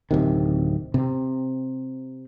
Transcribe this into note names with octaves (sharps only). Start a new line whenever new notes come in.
D1 C3 D#3
C3 C4